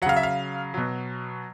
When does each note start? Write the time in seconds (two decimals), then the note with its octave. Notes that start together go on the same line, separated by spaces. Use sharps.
0.02 F#3 F#5
0.06 C#3 F5
0.16 E5
0.23 F5
0.74 B2 F#3